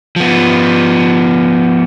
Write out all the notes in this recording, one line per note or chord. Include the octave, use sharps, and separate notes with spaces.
F3 B3